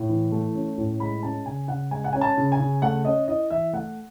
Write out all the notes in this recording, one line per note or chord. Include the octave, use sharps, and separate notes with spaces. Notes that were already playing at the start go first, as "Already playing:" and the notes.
Already playing: A2
E3
A3
C#4
A2
G#3 B5
C#4 A5
C#3 G#5
C#3 F#5
G#3 G#5
F#5
C#4 G#5
A5
C#3
G#5
C#3
A3 F#5
C#4 D#5
E4 D#5
E3 E5
A3 F#5